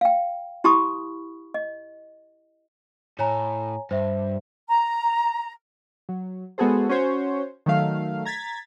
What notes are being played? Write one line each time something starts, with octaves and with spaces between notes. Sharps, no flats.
F5 G5
E4 G4 A5 B5 C#6 D#6
D#5
A2 C#5 G#5 A#5
G2 C5 E5
A#5
F#3
G#3 B3 F#4 G#4 A4 C5
C#4 F#4 C5 C#5
D#3 F#3 A3 F5
A#5 G#6 A6 B6